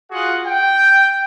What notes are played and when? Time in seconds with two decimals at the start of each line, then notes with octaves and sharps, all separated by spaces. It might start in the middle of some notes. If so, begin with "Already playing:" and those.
0.11 F4 F#4 G#4 F#5
0.46 G5